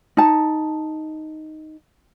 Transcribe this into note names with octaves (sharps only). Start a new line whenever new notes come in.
D#4 A5